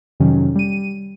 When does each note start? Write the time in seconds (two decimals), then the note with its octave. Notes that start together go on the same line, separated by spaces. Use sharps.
0.20 F2 C3 D#3 F#3 C#4
0.55 G3 D#7